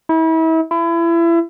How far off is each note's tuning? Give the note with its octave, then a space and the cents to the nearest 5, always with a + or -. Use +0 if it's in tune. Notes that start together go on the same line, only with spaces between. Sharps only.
E4 -35
E4 +30